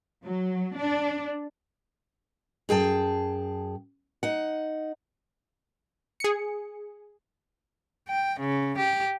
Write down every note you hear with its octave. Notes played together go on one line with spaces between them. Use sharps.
F#3
D4
F#2 G#4 G5 A5
D#4 F#5
G#4 C#7
G5
C#3
G4